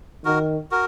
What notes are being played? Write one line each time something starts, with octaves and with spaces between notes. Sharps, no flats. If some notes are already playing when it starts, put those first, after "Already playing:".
D#3 F#4 A#4
F#4 A#4